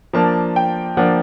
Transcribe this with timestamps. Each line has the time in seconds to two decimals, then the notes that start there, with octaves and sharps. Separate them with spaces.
0.13 F3 A#3 D4 A5
0.56 G5
0.97 F3 A#3 D4 F#5